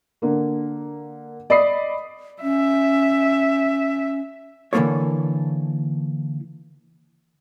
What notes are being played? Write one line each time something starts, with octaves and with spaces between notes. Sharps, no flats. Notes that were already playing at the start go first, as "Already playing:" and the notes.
D3 A#3
D5 D#5 B5 D#6 C7
C#4 E5
D3 E3 F3 A#3 A4 C#5